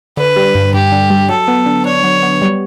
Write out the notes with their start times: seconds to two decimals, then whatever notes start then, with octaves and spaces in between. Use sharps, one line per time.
0.17 D3 B4
0.36 G3
0.55 G2
0.74 G2 G4
0.92 D3
1.10 G3
1.29 F#3 A4
1.48 B3
1.66 D3
1.85 D4 C#5
2.04 F#3
2.23 B3
2.42 G3